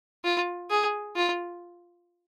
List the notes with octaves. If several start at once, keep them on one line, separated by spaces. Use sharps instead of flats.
F4
G#4
F4